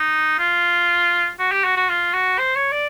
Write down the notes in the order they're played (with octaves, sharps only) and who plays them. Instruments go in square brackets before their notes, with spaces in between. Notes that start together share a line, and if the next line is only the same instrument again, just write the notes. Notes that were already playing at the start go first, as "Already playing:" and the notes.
Already playing: [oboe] D#4
F4
F#4
G4
F#4
F#4
F4
F#4
C5
C#5
D5